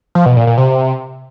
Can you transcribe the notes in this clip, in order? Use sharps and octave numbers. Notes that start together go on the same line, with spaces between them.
F3
B2
A#2
A#2
C3